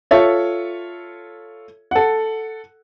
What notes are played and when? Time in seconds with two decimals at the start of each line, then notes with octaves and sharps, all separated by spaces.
0.11 F4 A4 C#5 E5
1.91 A4 F#5